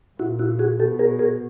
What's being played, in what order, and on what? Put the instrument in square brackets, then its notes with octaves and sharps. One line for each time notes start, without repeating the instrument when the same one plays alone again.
[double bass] A#2 [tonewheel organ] E4 F#4
[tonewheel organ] E4 F#4
F#4 G#4
[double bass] B2 [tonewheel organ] G4 A4
[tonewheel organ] G#4 A#4
G#4 A#4